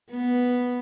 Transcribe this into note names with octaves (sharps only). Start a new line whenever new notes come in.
B3